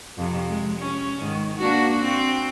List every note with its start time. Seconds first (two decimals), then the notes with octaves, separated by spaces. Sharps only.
0.17 F2 C3
0.49 G#3
0.78 C#4
1.20 G#2 D#3
1.57 A#3 D4 F#4
2.02 C4